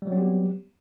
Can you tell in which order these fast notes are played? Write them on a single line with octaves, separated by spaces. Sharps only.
G3 F#3 C4 G4 B3